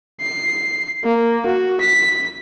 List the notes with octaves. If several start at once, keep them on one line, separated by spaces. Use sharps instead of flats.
C7
A#3
F#4
B6